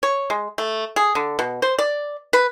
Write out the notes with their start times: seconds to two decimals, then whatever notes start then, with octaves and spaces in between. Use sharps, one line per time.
0.03 C#5
0.30 G#3
0.58 A3
0.96 G#4
1.15 D3
1.39 B2
1.62 C5
1.79 D5
2.33 B4